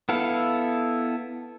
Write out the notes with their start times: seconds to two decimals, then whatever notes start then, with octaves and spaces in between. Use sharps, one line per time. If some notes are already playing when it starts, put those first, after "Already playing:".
0.09 B3 E4 A4 F5